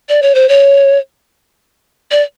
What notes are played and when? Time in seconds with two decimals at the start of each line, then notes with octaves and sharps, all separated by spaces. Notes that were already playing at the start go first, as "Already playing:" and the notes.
0.09 D5
0.22 C#5
0.35 C5
0.49 C#5
2.11 D5